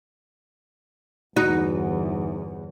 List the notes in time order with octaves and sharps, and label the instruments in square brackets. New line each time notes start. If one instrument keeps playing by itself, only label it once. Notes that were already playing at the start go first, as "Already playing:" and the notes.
[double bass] G1 E2 [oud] D#4 [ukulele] F#4